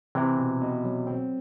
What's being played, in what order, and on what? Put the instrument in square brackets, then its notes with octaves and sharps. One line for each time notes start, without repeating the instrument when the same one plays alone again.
[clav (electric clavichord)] C3 E3 [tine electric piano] C4
[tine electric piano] B2
B2
F#3
C4